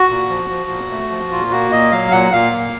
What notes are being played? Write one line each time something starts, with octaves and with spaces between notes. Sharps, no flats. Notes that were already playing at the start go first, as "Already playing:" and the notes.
Already playing: F#4
A#2
F3
F3
A#2
A3
F3
A#2 F4
A#3 F#4
A#2 D#5
F#3 F5
A#2 F#5
A#2 F5
A#3